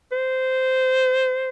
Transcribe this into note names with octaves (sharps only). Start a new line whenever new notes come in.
C5